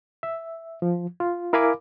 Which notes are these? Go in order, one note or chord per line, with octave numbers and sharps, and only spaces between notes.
E5
F3
F4
E4 A#4 F5 G#5 B5 D6